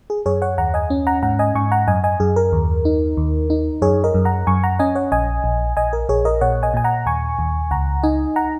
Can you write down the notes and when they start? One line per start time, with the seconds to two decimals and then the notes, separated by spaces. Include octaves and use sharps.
0.10 G#4
0.26 F#2 G#4 C#5
0.42 C#5 F#5
0.58 D#2 F#5 A#5
0.74 D#5 G#5
0.90 C#4
1.07 F#5 A#5
1.23 G#2 F#5 A#5
1.39 D#5 G#5
1.55 G#2 G#5 C#6
1.72 F#5 A#5
1.87 F#2 D#5 G#5
2.04 D#5 G#5
2.20 F#2 G#4
2.36 A#4
2.53 D#2
2.85 D#4
3.17 D#2
3.50 D#4
3.82 F#2 G#4 C#5
4.04 A#4 D#5
4.14 F#2
4.25 F#5 A#5
4.47 F#2 G#5 C#6
4.63 F#5 A#5
4.79 C#4 D#5 G#5
4.95 C#5 F#5
5.12 A#1 D#5 G#5
5.44 A#1
5.77 A#1 D#5 G#5
5.93 A#4
6.09 A#1 G#4 C#5
6.25 A#4 D#5
6.41 A#2 C#5 F#5
6.63 D#5 G#5
6.74 A#2 G#5
6.84 F#5 A#5
7.06 D#2 G#5 C#6
7.39 D#2
7.71 C#2 F#5 A#5
8.03 D#4 D#5 G#5
8.36 F#5 A#5